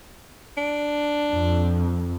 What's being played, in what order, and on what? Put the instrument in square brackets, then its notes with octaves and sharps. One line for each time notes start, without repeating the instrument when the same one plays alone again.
[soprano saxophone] D4
[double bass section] F2